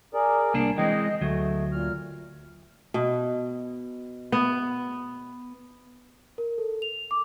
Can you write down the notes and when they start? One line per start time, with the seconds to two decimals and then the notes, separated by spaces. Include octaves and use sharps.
0.14 G#4 A#4 D5
0.54 C2 A#3 D4
0.78 E3 G#3 C4 D#5 G5
1.21 D2 F#3 A3
1.72 A#2 F6
2.94 B2
4.32 B3
6.38 A#4
6.58 A4
6.82 F7
7.11 D6